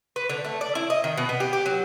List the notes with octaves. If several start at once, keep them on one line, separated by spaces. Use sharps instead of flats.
B4
D3
A3
D5
E4
D#5
D#3
B2
B3
G4
G4
F#3